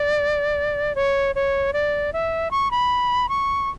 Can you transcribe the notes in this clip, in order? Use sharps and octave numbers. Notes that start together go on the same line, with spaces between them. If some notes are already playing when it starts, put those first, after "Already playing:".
Already playing: D5
C#5
C#5
D5
E5
C#6
B5
C#6